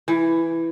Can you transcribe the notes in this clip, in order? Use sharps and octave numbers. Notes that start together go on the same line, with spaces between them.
E3